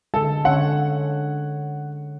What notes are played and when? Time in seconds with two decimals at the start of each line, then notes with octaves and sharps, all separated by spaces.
0.14 D3 G#3 A4
0.45 D3 C#4 C#5 F#5